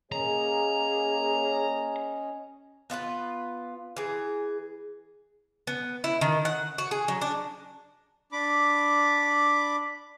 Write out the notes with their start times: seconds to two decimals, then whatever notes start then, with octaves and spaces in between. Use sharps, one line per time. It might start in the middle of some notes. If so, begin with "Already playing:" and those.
0.12 A#3 C#4 G#4 C#5 D#5 A#5
2.90 B3 F4 G4 B4
3.97 E3 G#4
5.67 B3
6.04 E4
6.21 D#3
6.45 F#5
6.78 F#4
6.91 G#4
7.08 F#3
7.21 D4
8.32 D4 B5 D6